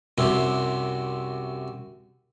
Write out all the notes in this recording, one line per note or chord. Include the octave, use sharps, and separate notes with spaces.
C2 F#2 C3 C4